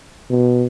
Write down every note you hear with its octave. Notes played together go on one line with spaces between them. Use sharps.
B2